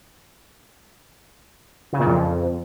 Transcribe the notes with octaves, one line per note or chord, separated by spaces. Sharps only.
C#3
A#2
F2